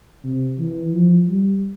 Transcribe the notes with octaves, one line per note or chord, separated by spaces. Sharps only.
C3
E3
F3
G3